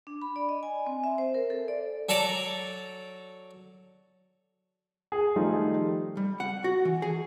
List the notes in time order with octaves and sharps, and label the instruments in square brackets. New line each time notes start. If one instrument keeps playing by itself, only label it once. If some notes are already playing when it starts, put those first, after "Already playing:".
[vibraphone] D4
B5
D5
D#5
G#5
C4
E5
C5
A#4
A4
D5
[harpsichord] F#3 A4 D5 A#5 D6
[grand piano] G#4
D#3 F3 G3 A3 D#4 F4
[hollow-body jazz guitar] G3
F#5
F#4
E3
G#4